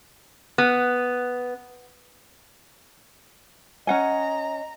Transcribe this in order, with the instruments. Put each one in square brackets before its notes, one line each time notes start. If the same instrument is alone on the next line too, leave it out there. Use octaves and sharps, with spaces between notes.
[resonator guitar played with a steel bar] B3
[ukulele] C#4 F#5 G#5 [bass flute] D#5 [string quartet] A#5